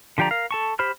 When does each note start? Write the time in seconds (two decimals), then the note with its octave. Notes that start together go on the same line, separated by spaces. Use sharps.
0.18 D3 F3 G4 D5 A#5
0.31 A#4 F5
0.51 A4 A5 C#6
0.79 G4 C5 B5 F6